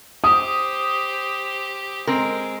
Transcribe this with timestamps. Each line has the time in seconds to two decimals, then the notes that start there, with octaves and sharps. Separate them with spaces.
0.24 G4 C5 D#6
2.07 G#3 C4 A#4